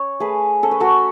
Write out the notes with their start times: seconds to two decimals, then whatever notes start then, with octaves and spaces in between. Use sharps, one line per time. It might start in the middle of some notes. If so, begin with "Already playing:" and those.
Already playing: C#4 C#5
0.20 A3 G#4 B4
0.63 C#4 A4
0.71 B4
0.80 F#4 A4